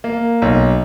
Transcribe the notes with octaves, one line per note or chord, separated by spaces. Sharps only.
A#3
B1